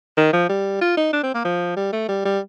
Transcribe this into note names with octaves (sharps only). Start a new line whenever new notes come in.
D#3
F3
G3
F4
D#4
D4
C4
A#3
F3
G3
A3
G3
G3